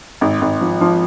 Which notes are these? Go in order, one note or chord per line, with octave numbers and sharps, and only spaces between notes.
G#1
G#1
F3
F3